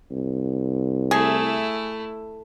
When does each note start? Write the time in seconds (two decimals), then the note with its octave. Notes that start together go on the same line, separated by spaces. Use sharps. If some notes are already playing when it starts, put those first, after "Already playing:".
0.11 C2
1.11 A3 E4 G#4